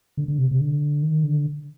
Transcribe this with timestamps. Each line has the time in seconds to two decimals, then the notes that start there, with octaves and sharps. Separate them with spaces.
0.17 D3
0.28 D3
0.38 C3
0.51 C3
0.60 D3
1.03 D#3
1.24 D3